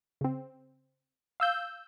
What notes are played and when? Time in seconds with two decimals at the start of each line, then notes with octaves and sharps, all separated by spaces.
0.21 C#3 C4
1.40 F5 E6 G6